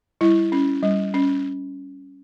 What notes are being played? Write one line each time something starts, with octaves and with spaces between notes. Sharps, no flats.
G3 E4
C#4
G3
C#4